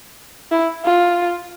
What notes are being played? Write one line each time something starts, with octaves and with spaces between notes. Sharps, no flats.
E4
F4